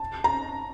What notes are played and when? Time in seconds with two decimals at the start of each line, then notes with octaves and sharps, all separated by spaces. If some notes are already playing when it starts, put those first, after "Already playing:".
Already playing: A5
0.24 A#5